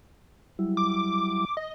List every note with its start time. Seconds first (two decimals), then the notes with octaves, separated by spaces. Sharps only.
0.59 F#3 G3 E4
0.77 D6
1.57 D#5